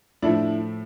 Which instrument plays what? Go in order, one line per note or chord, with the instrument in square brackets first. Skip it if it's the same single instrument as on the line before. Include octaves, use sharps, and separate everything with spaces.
[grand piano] A2 F3 A3 D4 E4